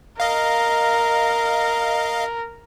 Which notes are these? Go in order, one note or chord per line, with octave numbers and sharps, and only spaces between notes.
A#4 D#5 F5